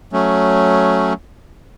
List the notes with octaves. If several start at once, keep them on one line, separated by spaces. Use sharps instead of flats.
F#3 A3 C#4